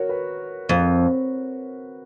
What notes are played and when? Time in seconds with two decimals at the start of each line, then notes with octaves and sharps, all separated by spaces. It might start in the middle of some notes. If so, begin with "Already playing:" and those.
Already playing: F#4 A#4 C#5
0.09 B4
0.69 F2